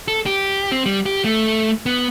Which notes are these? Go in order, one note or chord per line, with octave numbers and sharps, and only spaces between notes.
A4
G4
C4
G3
G4
A3
B3